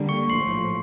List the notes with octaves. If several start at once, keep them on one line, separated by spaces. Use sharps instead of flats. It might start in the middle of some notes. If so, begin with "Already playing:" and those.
Already playing: D3 G3 A#3
C#6 C#7
A#1 A2 F3 C6 C7